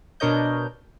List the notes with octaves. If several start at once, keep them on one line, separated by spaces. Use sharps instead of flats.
B2 D4 A#4 C#5 D#5 G6